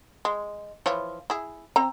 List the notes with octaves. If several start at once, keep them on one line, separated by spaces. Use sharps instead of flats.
G#3
E3 F3 C#5
E4 G#4
C4 A#5